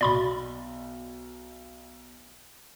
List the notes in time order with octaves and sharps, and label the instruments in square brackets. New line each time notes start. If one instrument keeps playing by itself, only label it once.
[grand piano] B1 B2 [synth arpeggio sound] D5 B5 C6